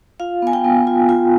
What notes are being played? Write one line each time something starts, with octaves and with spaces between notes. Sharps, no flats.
F4 F5
B3 G#5
G5
B3
F4
F4